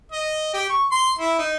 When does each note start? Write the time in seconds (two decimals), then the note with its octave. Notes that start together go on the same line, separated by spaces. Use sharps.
0.12 D#5
0.54 G4
0.70 C#6
0.91 C6
1.19 E4
1.39 D#4